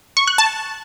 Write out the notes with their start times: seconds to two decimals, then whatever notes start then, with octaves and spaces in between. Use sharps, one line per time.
0.17 C#6
0.27 F#6
0.38 A5